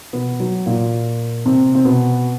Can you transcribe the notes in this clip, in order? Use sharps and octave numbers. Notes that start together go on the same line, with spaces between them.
B2 B3
F#3
A#2 A#3
C3 C4
C4
B2 B3